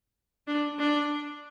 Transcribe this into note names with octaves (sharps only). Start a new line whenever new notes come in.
D4
D4